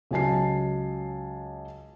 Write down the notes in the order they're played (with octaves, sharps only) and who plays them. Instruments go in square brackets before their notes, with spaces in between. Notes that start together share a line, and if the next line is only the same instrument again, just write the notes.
[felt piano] C#2 F#3 G#5 A5 C7